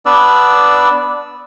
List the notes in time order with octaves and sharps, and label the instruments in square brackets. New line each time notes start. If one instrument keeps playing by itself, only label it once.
[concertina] B3 D4 B4 D5 E6